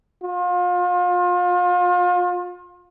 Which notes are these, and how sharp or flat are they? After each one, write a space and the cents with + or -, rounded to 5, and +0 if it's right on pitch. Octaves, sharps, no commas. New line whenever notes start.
F4 +35